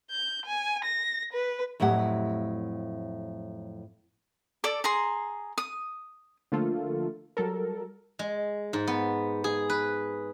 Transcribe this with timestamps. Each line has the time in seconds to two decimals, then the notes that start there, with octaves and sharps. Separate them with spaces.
0.11 G6
0.45 G#5
0.84 A#6
1.33 B4
1.80 F2 A2 F#3 G4 F#5
4.64 A4 D5 D6
4.84 G#4 A#5 C6
5.58 D#6
6.52 D3 F3 A3 A#3 F4 A4
7.37 F#3 G3 A4 A#4
8.19 G#3
8.73 G#2
8.87 B3
9.44 G#4
9.70 B4